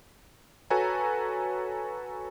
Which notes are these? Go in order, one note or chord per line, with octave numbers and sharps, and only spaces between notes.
F#4 A4 B4 C#5 G#5 A#5